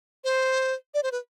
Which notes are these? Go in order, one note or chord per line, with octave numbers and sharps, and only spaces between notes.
C5
D5
C5
B4